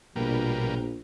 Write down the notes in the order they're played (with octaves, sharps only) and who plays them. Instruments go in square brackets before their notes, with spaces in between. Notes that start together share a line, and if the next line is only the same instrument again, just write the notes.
[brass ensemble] A#1 [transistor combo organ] B2 G3 A#3